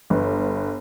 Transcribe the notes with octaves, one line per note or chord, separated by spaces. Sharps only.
G1 B4